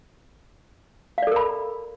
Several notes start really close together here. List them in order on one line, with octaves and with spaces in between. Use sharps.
F5 D5 A4 A#4 B5